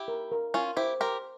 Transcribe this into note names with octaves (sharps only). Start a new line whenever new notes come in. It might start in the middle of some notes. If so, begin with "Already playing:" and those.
Already playing: E4 G4
A#4
A#4
C#4 F4 C6
E4 G4 C5
G4 A#4 C6